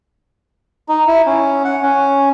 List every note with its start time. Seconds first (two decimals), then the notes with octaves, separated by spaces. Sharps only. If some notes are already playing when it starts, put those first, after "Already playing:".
0.89 D#4
1.07 E4
1.26 C#4
1.65 F#5
1.82 C#4